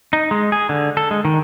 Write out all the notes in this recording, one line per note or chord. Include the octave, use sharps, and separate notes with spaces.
D#4
G#3
G#4
D3
A4
G#3
D#3